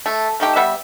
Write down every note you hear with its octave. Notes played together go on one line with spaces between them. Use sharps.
A3
A3 D#4 G4
G3 B3 E5